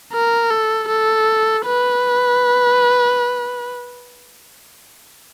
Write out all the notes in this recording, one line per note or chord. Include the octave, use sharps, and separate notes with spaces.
A#4
A4
A4
B4